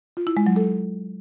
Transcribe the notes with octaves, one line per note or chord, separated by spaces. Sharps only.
F4
E4
G#3
F#3
A4